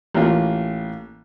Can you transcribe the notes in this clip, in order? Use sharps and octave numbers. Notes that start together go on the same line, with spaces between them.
A1 A#3 F4